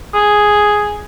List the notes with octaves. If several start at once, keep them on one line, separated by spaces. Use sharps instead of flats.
G#4